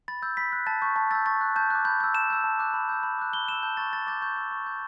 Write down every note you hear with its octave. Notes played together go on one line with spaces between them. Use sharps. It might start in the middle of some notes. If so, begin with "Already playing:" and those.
B5 A6
E6 G6
B5 B6
F#6
A5 A6
C#6 G6
A5
E6 G6 A6
C#6 A6
F#6
A5 G6
D6 F#6
B5 G6
E6 G6
A5 E7
E6 G6
A5
D6 F#6
B5
E6 G6
B5
D6 F#6
B5 G7
E6 G6 E7
A5 G6
C#6 G6 A6
A5 A6
D6 G6 A6
C#6 G6
E6 G6
C#6
G6